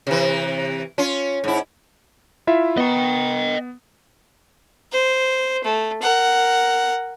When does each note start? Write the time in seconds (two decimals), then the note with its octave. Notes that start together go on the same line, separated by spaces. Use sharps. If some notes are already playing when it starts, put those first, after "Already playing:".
0.07 C3 E3
0.98 C#4 F4
1.44 G#2 E4
2.47 E4 F4 E5
2.77 B3 D#5 G5
4.92 C5
5.64 A3
6.02 A#4 F#5